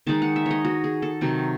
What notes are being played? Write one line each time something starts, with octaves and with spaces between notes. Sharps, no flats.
D#3 G#3 D#4 A5
F#5
E5
C#5 D#5
F#4
G#4
A4
C3 D#3 F#3